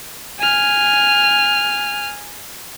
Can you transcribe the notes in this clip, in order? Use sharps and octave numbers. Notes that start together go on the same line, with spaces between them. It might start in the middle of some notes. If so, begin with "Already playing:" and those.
G#5 F6